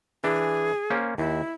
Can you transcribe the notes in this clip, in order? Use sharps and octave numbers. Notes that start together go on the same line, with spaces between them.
E3 D4 G#4
A#3 C#4 C5
D#2 E4